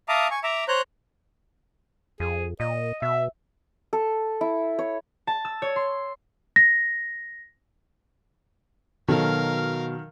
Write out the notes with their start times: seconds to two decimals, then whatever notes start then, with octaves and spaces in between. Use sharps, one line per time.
0.09 E5 F5 A5 A#5 D6 D#6
0.31 G#5 C#6
0.44 E5 A#5 D6 E6
0.68 C5 C#5 A#5 F#6 G6
2.20 F2 G#4
2.60 A#2 D#5
3.02 B2 E5
3.93 A4
4.41 E4
4.79 C#5
5.27 A5
5.45 E6
5.62 C#5
5.76 C6
6.56 A#6
9.08 B2 D#3 F#3 A4 A#4 F5